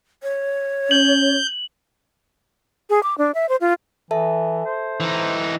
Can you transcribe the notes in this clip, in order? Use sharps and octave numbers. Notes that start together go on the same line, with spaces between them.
C#5
C#4 G6 F#7
G#4
D6
D4
E5
C5
F4
E3 A4 E5 A5
C5
E3 D#4